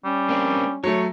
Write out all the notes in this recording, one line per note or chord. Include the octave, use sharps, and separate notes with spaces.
G3 C#4
A#3 C4 D4
F#3 A3 C#5